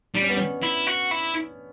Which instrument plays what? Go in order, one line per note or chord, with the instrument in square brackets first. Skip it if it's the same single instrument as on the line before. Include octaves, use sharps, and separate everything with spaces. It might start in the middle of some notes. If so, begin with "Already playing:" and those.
[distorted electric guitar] G3 [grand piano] D4
[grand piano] C#4
B3
C#4
[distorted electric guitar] E4
F#4
E4